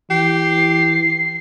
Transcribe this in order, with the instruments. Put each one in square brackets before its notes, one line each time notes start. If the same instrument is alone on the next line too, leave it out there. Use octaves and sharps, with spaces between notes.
[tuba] E3 [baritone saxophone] G4 [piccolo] C7